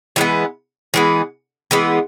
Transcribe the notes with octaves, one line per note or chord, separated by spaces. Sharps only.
E3 G#3 B3
E3 G#3 B3
E3 G#3 B3